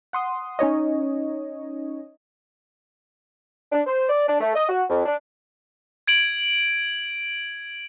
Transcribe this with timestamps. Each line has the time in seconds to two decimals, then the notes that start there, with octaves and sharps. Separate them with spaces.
0.13 F#5 C6 D#6
0.59 C#4 D#4 C#5 D#5
3.72 D4
3.87 C5
4.09 D5
4.28 D4
4.41 A3
4.55 D#5
4.69 F#4
4.90 F2
5.05 D4
6.07 G#6 D7 F#7